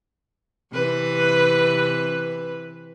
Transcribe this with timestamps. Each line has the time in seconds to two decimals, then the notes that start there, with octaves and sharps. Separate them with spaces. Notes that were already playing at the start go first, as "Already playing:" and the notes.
0.73 C3 E3 B4